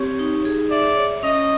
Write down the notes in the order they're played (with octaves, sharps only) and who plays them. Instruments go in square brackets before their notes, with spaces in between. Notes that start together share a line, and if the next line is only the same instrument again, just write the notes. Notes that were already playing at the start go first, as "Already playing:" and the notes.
Already playing: [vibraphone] C4 G4 [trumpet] C#5
[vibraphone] D#4
G#4
[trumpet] D5 [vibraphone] E5
[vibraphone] C#5
[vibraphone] C#4 [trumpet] D#5